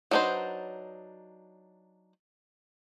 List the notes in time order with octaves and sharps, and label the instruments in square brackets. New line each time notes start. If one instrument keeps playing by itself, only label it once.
[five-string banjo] F#3 D4 D#4 B4 C5